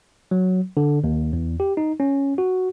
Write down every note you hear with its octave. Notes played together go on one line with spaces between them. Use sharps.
F#3
D3
D#2
E2
G4
D#4
C#4
F#4